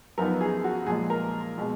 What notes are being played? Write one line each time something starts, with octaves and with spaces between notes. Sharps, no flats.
F#2 F3 B3 D#4 A#4
G#4
F#4
A#2 F3 G#3 G#4
A#4
B2 G#3